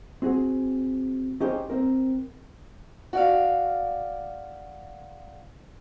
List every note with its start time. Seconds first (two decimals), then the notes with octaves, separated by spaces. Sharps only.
0.22 C4 F#4 G#4
1.41 C#4 D#4 G4 G#4 C5
1.70 C4 A#4
3.13 F#4 D5 F5